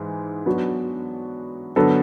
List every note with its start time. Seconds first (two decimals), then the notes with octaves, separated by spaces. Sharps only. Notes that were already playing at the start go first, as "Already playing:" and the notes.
Already playing: G#2 E3 G#3
0.46 F#3 B3 D4 F#4
1.76 D3 F#3 B3 D4 A4